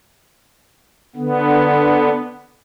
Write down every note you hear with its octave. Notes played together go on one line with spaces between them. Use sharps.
D3 B3